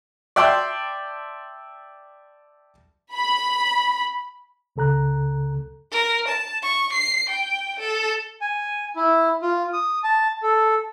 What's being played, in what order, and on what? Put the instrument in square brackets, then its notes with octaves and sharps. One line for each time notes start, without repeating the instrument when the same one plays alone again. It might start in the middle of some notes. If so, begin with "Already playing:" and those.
[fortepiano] D5 E5 G5 A5 C6
[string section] B5
[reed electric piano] C#2 C#3 A4 A#5 F#6
[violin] A#4
A5
C#6
C7
G5
A4
[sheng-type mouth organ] G#5
E4
F4
D#6
A5
A4